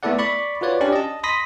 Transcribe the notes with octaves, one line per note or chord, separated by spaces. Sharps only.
A3 B3 E4 A4 D5 F#5
D5 B5 C#6
F4 F#4 B4 C#5 D5
C#4 D4 G4 D5
D#5 A5
B5 C6 D#6 A#6 B6